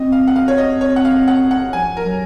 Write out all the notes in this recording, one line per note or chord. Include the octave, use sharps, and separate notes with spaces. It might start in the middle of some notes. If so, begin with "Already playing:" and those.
Already playing: C4 D#5
F5
F#5
F5
C#5
D#5
C#5
F#5
F5
F#5
F#5
F3 G#5
A#4
F#3